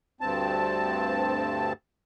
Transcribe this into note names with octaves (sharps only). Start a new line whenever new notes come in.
D2 G2 C4 A5